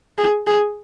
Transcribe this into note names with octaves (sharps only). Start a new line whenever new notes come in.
G#4
G#4